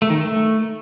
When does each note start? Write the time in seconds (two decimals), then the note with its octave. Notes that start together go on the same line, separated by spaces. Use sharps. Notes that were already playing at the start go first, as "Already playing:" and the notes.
0.02 A3
0.10 D#3
0.18 A3